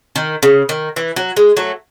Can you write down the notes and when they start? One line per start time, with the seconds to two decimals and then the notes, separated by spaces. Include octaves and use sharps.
0.16 D#3
0.43 C#3
0.69 D#3
0.96 E3
1.16 F#3
1.37 G#3
1.57 F#3 A3